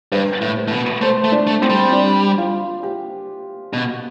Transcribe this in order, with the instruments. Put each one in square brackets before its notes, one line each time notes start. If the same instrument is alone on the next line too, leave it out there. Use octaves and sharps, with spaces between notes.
[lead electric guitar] G2 [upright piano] B4
[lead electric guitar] A2
[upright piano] B4
[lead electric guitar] A2
B2
[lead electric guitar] A3 [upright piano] C5
[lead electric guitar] A3
[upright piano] D4
[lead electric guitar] A3
[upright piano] C4
[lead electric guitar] G3
[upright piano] D4
F4
G4
[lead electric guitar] B2